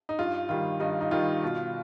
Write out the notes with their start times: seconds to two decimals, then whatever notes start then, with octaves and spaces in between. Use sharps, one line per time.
0.09 D#4
0.19 G2 F4
0.49 D#3 G3 F4
0.80 G2 D#4
1.01 D#4
1.11 D#3 G3 F4
1.43 B2